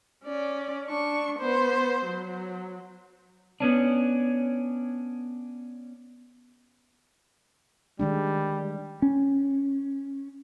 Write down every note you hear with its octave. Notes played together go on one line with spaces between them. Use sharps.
C#4 D5
D4 C#6
B3 C5
F#3
B3 C#4 D4
D#3 G3 G#3 D4
C#4